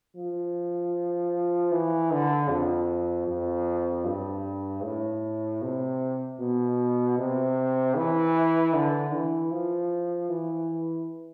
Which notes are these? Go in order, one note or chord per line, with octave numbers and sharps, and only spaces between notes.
F3
E3
D3
F2
F2
G2
A2
C3
B2
C3
E3
D3
E3
F3
E3